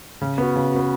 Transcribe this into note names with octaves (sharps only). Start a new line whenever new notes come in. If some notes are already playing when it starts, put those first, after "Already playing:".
C#3
B3 F#4
C#3
B3 F#4